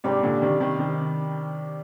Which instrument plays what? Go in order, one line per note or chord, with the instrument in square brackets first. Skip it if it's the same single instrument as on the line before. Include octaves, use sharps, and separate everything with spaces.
[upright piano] G#2 C3 [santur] G3 D4 G4 D5
[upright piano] A#2 D3
C3 D#3
C3 D#3
C3 D#3